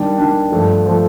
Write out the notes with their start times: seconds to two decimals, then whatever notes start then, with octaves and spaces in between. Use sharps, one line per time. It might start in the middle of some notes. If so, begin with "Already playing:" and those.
Already playing: D#3 G3 D4
0.18 D#3 G3 D4
0.52 G2 F3 A3
0.86 F3 A3